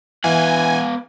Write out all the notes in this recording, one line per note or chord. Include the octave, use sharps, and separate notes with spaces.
E3 B3 F5 F#5 G#5